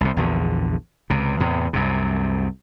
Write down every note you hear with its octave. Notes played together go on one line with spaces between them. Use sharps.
C2 C3
A#1 E2 D3
C#2 C3
E2 A2 C3
C2 F#2 C3